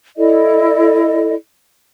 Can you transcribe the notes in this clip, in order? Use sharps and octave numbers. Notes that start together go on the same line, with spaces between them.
E4 A4 D5 D#5